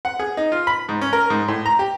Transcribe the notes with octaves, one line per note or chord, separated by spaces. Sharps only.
F#5
G#4
D#4
F4
B5
G#2
C#4
A#4
G#2
A2
A#5
G4